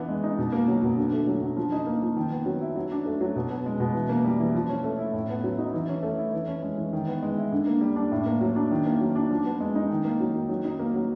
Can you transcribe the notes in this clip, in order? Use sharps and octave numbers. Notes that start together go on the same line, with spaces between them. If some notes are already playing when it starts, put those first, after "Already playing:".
Already playing: E3 B3 D4
G#3
D#4
B2
A#3
F#3
B2
D3
A3
F#3
D3
F3
D#4
A#3
F3
D#3
B3
F#3
E4
F#3
D4
A3
F#3
B2
B3
G#3
B2
E3
A#3
G3
E3
F3
C#4
A3
E4
A2
B3
F#3
D#4
E3
C#4
A3
E4
E3
C#4
G#3
E3
D#3
B3
G#3
E4
D3
A#3
G3
D4
A2
A#3
F#3
D4
D#3
A#3
F#3
D4
F3
B3
G#3
D#4
D#3
A#3
F#3
D#3
F#3
D#4
A#3
F#3